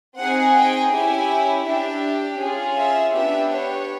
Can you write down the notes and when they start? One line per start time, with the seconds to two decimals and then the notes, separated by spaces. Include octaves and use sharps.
0.18 C4 D#4 G#4 F#5
0.57 G5
0.93 C#4 E4 G4 G#5
1.67 D4 G4 E5
2.42 C#4 F4 G#4
2.79 E5
3.15 B3 D4 G4 E5
3.53 C#5